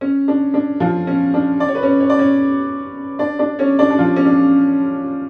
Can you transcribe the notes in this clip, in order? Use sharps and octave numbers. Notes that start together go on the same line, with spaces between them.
C#4
D4
D4
F3 F4
C#4
D4
D5
C#5
B4
C#4 C#5
C#5
D5
C#4 C#5
D4 D5
D4 D5
C#4 C#5
D4 D5
D4
F3 F4
C#4
D4